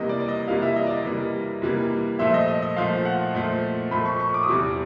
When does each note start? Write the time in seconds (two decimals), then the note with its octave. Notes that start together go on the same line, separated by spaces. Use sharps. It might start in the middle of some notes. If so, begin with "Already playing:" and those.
Already playing: C3 E3 G3 A#3 D#5
0.09 D5
0.20 D5
0.28 D#5
0.47 C3 E3 G3 A#3 F5
0.62 E5
0.76 D#5
0.86 D5
0.90 D#5
1.05 C3 E3 G3 A#3
1.62 C3 E3 G3 A#3
2.19 A#2 F3 A3 E5
2.34 D#5
2.48 D#5
2.62 D#5
2.76 A#2 F3 A3 F5
3.05 F#5
3.34 A#2 F3 A3
3.91 A#2 F3 A3 B5
4.05 C#6
4.20 C#6
4.34 D6
4.43 D#6
4.48 E2 C3 E3 G3 D6